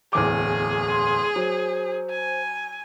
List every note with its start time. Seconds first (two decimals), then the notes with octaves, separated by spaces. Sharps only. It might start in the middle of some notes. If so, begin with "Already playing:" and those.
0.13 D1 E2 G#4 D6
0.89 C6
1.36 F#3 C5
2.10 G#5